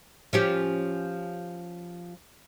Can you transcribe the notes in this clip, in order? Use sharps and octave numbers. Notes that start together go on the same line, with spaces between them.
F3 C#4 G4